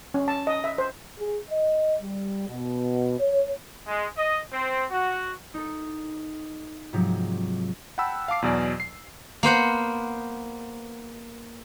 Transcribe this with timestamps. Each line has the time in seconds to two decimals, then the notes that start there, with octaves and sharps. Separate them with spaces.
0.14 C#4
0.28 A5
0.47 D#5
0.64 E5
0.78 C5
1.19 G#4
1.50 D#5
2.02 G3
2.49 B2
3.20 C#5
3.87 G#3
4.17 D#5
4.52 C4
4.91 F#4
5.54 D#4 A4
6.93 G#2 C3 F3 F#3
7.98 F#5 G5 A5 B5 E6
8.28 F5 A5 D6 C7
8.42 E2 B2 F#3 D5 G#5
8.80 C7
9.43 A#3 B3 C5 F#5